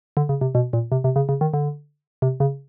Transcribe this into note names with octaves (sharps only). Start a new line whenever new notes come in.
D3
C#3
C3
B2
A#2
C3
C3
C#3
C#3
D#3
D3
C3
C#3